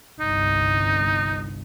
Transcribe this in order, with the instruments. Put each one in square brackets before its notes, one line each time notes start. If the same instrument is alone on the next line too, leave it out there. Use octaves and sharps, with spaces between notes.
[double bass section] G1 C2 [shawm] D#4